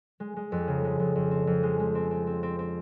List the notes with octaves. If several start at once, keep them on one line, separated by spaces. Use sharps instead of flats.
G#3
G#3
F2
C#3
G#3
F2
F2
C4
F2
G#3
G#3
C4
C4
C4
C4
C4